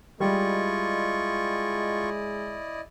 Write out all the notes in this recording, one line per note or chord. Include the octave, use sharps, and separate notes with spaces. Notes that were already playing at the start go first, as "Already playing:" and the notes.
G3 G#3 E4 F4 D5 D#5 C#6